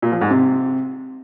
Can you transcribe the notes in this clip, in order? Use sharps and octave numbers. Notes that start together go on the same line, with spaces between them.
A#2
F3
G#2
C3